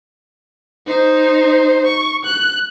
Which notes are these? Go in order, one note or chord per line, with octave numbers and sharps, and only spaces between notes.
D#4 C5
C#6
F#6